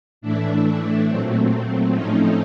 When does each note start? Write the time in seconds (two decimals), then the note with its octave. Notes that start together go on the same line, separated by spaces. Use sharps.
0.21 A2 E3 A3 D4 E4
1.08 A#2 F#3 A3 C4
1.93 A2 F3 A3 C4 C#4 D#4